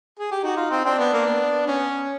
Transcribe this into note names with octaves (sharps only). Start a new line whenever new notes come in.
G#4
G4
D#4 F#4
F4
C4
C4 D4
B3
A#3
B3
C#4